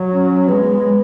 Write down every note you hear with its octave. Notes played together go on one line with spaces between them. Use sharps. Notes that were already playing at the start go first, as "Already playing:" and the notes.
Already playing: F#3
C#4
G#3 B3